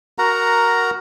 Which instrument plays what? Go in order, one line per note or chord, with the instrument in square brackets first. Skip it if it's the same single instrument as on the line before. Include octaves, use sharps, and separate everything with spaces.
[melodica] F#4 A#4 F#5 A#5